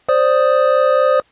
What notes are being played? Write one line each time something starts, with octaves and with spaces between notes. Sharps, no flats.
C5 D5 D#6